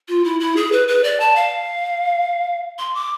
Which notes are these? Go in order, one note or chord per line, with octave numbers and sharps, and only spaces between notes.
F4
E4
E4
G#4
B4
B4
D5
A5
F5
C6
D6